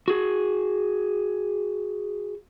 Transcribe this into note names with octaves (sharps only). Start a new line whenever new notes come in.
F#4 G#4